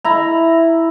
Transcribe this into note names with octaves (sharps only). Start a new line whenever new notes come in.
E4 A#5